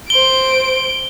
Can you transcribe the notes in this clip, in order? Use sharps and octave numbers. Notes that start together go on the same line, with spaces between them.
C5 D7 G7